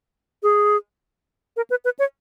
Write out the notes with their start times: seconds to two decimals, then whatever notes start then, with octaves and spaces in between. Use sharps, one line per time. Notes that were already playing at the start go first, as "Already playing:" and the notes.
0.43 G#4
1.57 A#4
1.70 B4
1.85 B4
1.99 C#5